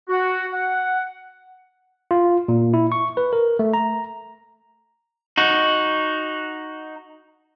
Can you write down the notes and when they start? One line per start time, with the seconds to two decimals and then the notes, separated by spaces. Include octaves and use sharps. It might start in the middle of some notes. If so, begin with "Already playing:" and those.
0.09 F#4
0.53 F#5
2.11 F4
2.48 A#2
2.74 E4
2.92 C#6
3.17 B4
3.33 A#4
3.59 A3
3.74 A#5
5.37 D#4 F#4